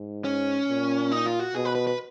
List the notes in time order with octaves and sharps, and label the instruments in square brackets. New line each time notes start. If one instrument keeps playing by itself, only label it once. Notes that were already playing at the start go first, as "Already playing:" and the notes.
Already playing: [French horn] G#2
[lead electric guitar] C#4
[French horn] A#2
[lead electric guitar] D#4
F4
F#4
[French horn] B2 [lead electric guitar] G#4
[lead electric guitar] B4
B4
B4